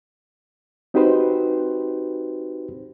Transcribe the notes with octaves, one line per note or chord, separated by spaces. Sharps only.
C4 D#4 F#4 G4 B4 C5